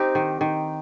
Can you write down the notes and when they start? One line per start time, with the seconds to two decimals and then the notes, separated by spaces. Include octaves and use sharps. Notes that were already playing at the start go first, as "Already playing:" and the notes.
Already playing: C4 D#4 G4
0.15 D#3
0.41 D#3